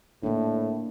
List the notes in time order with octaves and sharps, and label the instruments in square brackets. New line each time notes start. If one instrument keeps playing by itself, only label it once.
[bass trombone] A2 [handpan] A#3 D4